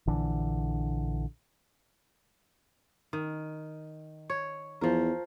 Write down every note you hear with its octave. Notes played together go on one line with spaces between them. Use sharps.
A#1 D3 E3
D#3
C#5
E2 F3 A#4